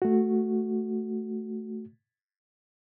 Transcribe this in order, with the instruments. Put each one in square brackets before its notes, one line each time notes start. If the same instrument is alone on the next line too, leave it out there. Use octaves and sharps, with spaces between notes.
[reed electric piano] A3 F#4